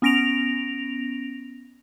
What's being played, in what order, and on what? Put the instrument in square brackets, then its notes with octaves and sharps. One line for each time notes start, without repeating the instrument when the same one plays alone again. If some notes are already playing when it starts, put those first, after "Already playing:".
[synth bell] B3 C#4 A#6 D7 F7